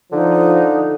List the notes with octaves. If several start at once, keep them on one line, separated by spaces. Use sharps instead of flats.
D3 F3 D#4